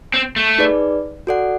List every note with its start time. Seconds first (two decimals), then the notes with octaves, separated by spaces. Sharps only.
0.14 C4
0.36 A3
0.58 D#4 G#4 B4 D5
1.27 F#4 A4 D5 F#5